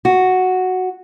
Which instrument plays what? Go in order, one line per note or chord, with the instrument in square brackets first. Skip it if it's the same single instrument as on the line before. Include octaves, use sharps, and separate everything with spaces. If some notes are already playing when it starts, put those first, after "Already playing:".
[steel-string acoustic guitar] F#4